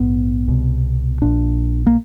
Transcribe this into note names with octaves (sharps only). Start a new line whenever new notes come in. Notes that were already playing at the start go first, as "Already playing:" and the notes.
Already playing: A#1 G#2 B3
C2 B2
A#1 A#2 D4
A#3